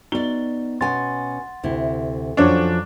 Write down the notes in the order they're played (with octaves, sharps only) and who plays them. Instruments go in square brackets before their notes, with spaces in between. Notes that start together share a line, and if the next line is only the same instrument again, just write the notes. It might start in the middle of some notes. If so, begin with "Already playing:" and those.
[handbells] B3 D#4 [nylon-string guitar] F#4 D5 [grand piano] G7
[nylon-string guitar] B2 C#4 G#5 [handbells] F#5 C6 A6
[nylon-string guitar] D2 C3 E4
[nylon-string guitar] F2 F3 C#5 [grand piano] F#3 C#4 D4